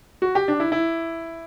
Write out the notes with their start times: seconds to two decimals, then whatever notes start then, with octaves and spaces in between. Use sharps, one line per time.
0.22 F#4
0.35 G4
0.48 D4
0.60 E4
0.72 E4